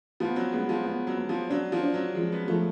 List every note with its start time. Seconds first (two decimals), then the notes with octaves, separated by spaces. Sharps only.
0.20 F3 B3
0.36 F#3
0.52 G#3 B3
0.69 F3
0.85 B3
1.07 F#3
1.17 B3
1.29 F3
1.50 F#3 D4
1.72 F3
1.83 D4
1.94 F#3
2.15 F3 G#3
2.32 B3
2.48 F3 A3